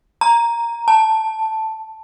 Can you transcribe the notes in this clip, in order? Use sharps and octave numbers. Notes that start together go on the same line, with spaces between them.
A#5
A5